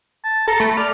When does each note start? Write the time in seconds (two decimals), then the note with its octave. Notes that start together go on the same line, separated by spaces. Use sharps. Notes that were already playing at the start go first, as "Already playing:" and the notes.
0.24 A5
0.47 A4 A#5
0.60 A3 B5
0.77 D5 F6